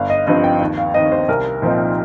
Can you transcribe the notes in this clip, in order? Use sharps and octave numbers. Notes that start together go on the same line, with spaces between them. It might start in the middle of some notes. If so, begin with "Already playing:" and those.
Already playing: G1 F5
D#5
G2 F3 C4 D#4 D#5
G5
D#2
F5
D#3 C4 D#4 D#5
C5
C2 A#4
A#2 F3 C4 D#4